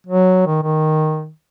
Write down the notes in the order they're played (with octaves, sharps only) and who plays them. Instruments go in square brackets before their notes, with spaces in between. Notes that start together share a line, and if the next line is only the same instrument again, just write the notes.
[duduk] F#3
D#3
D#3